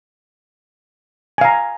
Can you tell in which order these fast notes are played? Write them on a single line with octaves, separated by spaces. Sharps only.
G#5 F5 A#5